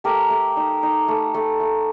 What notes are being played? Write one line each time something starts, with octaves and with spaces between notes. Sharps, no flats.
A3 G4 A#4
A3
D#4
D#4
A3
A3
A3